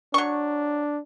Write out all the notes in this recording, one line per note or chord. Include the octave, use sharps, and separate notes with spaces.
F#3 D4 C#6